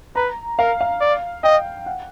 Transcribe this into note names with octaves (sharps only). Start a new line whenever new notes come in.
B4 A#5
A#4 F5
F5
D5
D#5 G5
F#5